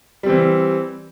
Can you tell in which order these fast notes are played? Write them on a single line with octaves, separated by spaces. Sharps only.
G3 C4 E3